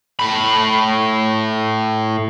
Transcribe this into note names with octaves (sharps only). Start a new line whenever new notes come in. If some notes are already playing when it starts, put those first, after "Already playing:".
A2 B5